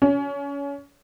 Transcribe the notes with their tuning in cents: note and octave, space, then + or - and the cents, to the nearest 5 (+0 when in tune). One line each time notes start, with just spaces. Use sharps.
C#4 +25